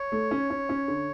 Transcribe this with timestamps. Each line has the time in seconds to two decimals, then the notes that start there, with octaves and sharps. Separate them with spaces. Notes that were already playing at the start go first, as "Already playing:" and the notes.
Already playing: C#5
0.12 A3
0.31 C#4
0.50 C#4
0.69 C#4
0.88 D3